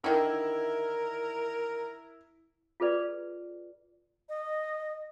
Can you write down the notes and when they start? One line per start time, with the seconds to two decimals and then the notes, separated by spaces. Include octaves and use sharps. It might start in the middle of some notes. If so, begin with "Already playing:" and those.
0.04 D3 D#3 E4 A#4
2.80 F4 G#4 A4 B4 D5
4.29 D#5